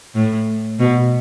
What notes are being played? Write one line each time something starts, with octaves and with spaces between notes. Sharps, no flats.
A2
B2